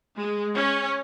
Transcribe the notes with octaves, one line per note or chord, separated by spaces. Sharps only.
G#3
C#4